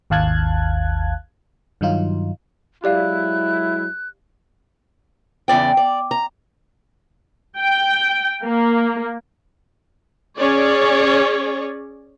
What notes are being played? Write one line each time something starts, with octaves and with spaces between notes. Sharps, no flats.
G#1 D#2 F5 A5 F#6 G#6
G2 D#3 F#3 D#4 F4
F#3 G#3 E4 G4 D5 F5 F#6
E2 C#3 D5 G5
D5
A#5
G5
A#3
C#4 G#4 C#5 D5